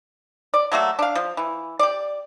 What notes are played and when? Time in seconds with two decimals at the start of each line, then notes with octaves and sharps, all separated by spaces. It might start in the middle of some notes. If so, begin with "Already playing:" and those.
0.54 D5
0.72 F#3 A3 A#3 F#4
0.99 D4 F5
1.15 F3
1.37 E3
1.79 G4 D5